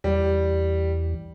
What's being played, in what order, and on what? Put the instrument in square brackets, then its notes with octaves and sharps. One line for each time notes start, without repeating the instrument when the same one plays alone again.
[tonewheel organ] E2 [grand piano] G3